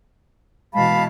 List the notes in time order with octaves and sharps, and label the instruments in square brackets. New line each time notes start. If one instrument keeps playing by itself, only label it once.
[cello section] B2 E3 G#3 [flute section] F5 A5 B5